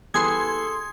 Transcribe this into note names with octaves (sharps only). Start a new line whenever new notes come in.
E3 G3 B3 G#4 A4 C6 G#6